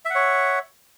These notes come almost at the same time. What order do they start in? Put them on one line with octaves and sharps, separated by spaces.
E5 F#5 C#5